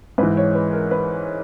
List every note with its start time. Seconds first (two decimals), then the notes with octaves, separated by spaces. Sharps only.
0.18 G#2 B4
0.23 E3
0.37 C#5
0.55 B4
0.73 A#4
0.91 B4